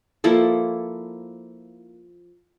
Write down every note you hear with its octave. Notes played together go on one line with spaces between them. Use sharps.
F3 A#3 E4 A4